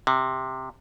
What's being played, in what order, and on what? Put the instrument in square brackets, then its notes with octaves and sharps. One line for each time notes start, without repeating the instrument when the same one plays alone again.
[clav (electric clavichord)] C3